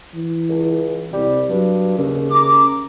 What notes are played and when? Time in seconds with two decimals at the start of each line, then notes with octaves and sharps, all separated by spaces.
0.15 E3
0.49 C#2
1.13 C2 G3
1.50 G2 F#3
1.98 D#2 C#3
2.31 A#5 D6